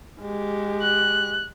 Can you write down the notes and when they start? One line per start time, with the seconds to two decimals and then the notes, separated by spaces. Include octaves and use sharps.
0.21 G#3 G4
0.82 F#6